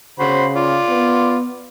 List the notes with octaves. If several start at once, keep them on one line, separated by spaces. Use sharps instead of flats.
C#3 F#4 C5 B5
F4 D5
B3